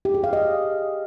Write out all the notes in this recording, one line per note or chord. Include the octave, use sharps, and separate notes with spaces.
G4
G#4
F5
D#5